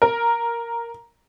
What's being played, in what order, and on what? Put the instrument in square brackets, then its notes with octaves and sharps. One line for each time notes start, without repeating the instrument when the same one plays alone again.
[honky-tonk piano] A#4